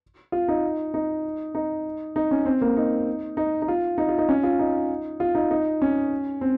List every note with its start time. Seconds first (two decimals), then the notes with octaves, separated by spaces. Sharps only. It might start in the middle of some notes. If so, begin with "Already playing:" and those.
0.32 F4
0.48 D#4
0.94 D#4
1.55 D#4
2.16 D#4
2.31 C#4
2.45 C4
2.62 A#3
2.77 D#4
3.37 D#4
3.62 D#4
3.68 F4
3.98 D#4
4.08 F4
4.18 D#4
4.29 C#4
4.43 F4
4.59 D#4
5.20 F4
5.35 D#4
5.51 D#4
5.82 C#4
6.41 C4